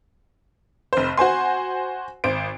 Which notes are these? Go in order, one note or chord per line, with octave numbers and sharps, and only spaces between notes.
F1 C5
F#4 C5 G#5 C6
G#1 C5 D7